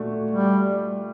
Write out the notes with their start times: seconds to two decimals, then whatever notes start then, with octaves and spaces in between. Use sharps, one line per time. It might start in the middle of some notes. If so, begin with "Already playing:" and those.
Already playing: A#2 A3 D4 F#4
0.31 G3